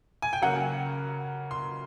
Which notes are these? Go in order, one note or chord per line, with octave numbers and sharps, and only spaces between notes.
G#5
G5
C#3 F#3 A#3 F#5
C6